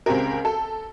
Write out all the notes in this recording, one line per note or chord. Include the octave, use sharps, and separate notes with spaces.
C#2 C4 G4 A#4
A4